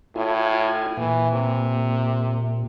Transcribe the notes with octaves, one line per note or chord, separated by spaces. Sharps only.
A2 E4 F4 G#5
A#2 E3
C3